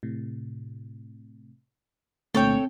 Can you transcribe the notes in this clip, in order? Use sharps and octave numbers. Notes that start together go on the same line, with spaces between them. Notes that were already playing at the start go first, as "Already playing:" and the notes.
A2 C3
C2 A#2 D3 A3 C4 A4 C#5 G5